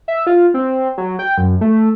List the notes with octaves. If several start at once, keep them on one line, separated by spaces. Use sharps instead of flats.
E5
F4
C4
F#3
G5
F#2
A3